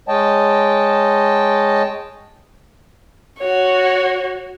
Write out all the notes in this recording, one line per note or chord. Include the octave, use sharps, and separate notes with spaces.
G#3 C#5 D#5 G5 A5
F#4 C#5